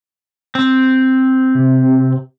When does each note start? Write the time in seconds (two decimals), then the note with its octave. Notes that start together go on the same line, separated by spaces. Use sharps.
0.55 C4
1.55 C3